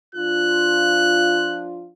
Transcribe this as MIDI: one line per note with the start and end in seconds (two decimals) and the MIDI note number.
0.15 1.88 53
0.15 1.88 62
0.15 1.88 65
0.15 1.64 90